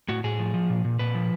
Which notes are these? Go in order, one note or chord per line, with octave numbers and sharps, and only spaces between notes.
A2 F#4
A2 G#4
F3
F3
A#2
A#2
A#2 B4
F3